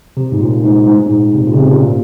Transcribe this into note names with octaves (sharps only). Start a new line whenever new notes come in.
C3
G#2
A#2
G#2
G#2
G#2
A#2
C3
A#2
C#3
C3
A#2